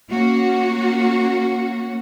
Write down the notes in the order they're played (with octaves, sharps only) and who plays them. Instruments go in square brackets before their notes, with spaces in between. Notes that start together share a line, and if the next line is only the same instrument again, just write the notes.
[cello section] A#3 C#4 F#4